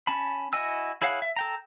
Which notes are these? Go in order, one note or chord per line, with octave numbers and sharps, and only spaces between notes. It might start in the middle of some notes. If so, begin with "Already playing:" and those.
C#4 A5 B5
E4 F#4 D#5 G#5 E6
E4 G#4 C#5 F5 F#5
E5
A4 G5 A#5